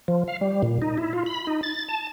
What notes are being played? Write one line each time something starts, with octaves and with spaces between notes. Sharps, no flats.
F3
F5
G3
A#2
D#4
E4
F4
B5
D#4
A6
A5